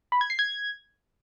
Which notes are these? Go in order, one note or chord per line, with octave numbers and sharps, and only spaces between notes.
B5
G#6
C7
G#6